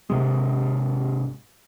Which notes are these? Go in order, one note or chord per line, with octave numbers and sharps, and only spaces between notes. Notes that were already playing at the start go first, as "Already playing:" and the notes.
G#1 C3 G#3